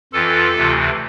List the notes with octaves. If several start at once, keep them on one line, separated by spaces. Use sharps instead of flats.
F2 E3 F4 A4
D2 C3 E3